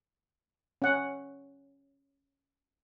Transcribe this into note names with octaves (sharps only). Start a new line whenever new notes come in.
C#4 F#5